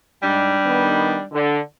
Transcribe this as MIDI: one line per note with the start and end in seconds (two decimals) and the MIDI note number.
0.23 0.55 44
0.23 1.23 55
0.23 1.23 62
0.66 1.15 51
0.66 1.15 59
1.32 1.59 50